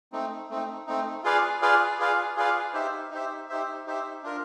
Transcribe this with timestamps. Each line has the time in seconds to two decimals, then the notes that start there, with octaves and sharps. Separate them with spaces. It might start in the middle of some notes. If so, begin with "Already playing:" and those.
0.12 A3 C4 D#4
0.50 A3 C4 D#4
0.87 A3 C4 D#4
1.24 F4 G#4 B4 D5 F5
1.62 F4 G#4 B4 D5 F5
1.99 F4 G#4 B4 D5 F5
2.36 F4 G#4 B4 D5 F5
2.74 D#4 G4 C5 E5
3.11 D#4 G4 C5 E5
3.49 D#4 G4 C5 E5
3.87 D#4 G4 C5 E5
4.23 D4 F4 A#4